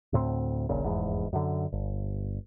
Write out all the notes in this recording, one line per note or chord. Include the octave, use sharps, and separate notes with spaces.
D2 A2 G#3 C4
D#1 A#1 A#2 C#3
F1 E2 G#2
F#2 D3
G1